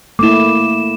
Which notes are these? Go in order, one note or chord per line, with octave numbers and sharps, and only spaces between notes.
A3 A#3 E4 D6 E7